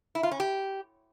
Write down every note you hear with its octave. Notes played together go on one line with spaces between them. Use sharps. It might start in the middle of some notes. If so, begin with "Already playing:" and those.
E4
F4
C#4
G4